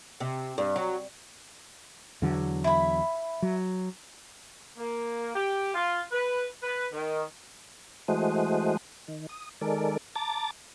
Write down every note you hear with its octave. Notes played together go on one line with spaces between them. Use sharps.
C3
G2
F#3
E2 D3 F#3
E4 B5
F#3
A#3
G4
F4
B4
B4
D#3
E3 G#3 A3 F#4 C5 D#5
D#3
D#6
D#3 G#3 A4 A#4 D5
A5 A#5 D6 A6